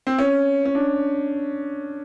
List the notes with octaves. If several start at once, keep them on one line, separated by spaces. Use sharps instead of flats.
C4
C#4
C#4
D4